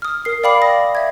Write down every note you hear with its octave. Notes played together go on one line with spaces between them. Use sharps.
D#6 F6
A#4 C7
D5 F5 G5 B5 D6 C7
D#6 A#6
E5 G#6